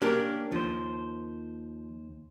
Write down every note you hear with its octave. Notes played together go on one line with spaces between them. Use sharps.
A#3 C#4 D4 G4 A#4
D#2 F3 C5